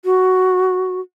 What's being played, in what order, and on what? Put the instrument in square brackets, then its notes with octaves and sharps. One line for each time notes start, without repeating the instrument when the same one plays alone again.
[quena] F#4